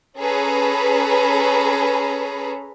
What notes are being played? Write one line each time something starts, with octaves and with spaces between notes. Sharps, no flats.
C#4 G#4 A4 B4 A#5 B5